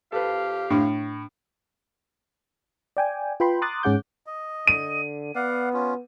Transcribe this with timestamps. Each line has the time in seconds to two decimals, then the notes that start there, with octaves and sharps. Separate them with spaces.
0.12 F2 G4 A4 B4 F5
0.70 A2 D4
2.97 D5 G5 G#5
3.40 F4 B4 G5 B5 C6
3.62 A#5 C6 D6 D#6 F#6 A6
3.83 G#2 C#4 G#4 F#5 D6 G6
4.26 D#5
4.67 D3 D#7
5.35 B3 D5 F5 F#5
5.73 C#4 F4